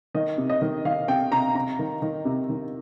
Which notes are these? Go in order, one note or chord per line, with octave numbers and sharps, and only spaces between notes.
D#3 D#5
C3
D#5
D#3
D#3 F5
C3 G5
C3 A#5
C3 A#5
D#3
D#3
C3
D#3